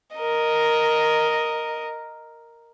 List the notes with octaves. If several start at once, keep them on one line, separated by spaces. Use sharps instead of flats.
A#4 D#5